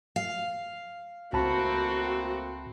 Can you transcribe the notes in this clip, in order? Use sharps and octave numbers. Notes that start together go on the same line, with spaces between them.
F5
C#2 A3 A#3 C4 F#4 A5 B5